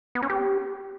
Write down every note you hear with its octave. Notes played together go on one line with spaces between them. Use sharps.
B3
C#4
G4